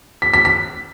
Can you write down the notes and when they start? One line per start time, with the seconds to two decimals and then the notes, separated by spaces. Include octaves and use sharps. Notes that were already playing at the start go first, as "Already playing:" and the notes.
0.22 B6
0.34 B6
0.45 B6